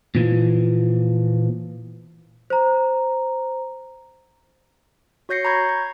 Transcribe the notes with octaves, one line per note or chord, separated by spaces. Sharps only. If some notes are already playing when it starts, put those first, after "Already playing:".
A#2 E3 F3
C5 A#5
F#4 C#5 G6 A#6 C7 C#7
A#5 B5 C#6 G6 G#6
G#6